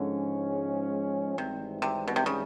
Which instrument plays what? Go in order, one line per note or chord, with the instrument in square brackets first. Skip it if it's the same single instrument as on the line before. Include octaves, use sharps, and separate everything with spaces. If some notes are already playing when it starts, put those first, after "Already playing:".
Already playing: [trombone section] G#2 F3 G#3 C#4 [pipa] D3
[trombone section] G#1 G#2 E3 G3 C4 [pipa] C3
[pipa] C3
B2
C3
C#3